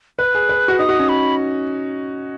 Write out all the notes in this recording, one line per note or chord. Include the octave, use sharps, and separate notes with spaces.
B4 F#6
G#4
B4
F#4
D#4 D#6
F#4
C#4
B5